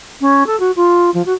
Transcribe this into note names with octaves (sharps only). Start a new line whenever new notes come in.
C#4
A4
F#4
F4
F3
F#4